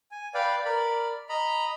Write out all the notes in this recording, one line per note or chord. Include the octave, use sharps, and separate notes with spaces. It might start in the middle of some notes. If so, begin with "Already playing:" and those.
G#5
B4 D5 F5 G5
A#4 D5 B5
D#5 A#5 B5